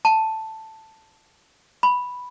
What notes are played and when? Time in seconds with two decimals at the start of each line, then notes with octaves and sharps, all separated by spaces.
0.05 A5
1.83 B5